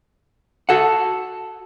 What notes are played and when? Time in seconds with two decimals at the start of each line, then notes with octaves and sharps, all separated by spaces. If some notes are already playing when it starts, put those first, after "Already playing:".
0.69 F#4 A4 F#5